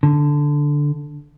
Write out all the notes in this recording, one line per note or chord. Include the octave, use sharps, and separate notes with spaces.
D3